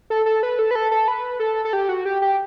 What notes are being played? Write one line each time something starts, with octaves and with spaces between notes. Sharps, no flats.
A4
A4
B4
A4
B4
A4
A4
B4
A4
A4
G4
F#4
G4
G4